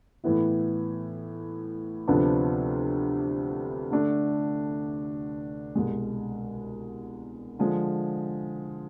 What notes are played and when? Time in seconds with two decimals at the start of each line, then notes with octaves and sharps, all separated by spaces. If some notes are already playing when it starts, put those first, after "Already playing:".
0.24 A2 E3 B3 E4
2.08 D2 C3 F3 B3 D4
3.91 D3 A3 D4
5.75 C2 B2 G#3
7.59 D3 F3 G#3